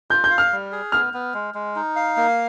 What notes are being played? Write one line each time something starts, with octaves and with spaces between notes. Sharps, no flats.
F4 G6
G6
F5
F6
G3
G#4
B3 F6
B3
G#3
G#3
D#4
F5
A#3